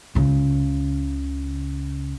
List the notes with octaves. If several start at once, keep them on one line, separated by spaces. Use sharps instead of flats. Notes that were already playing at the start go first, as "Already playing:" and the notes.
C#2 C#3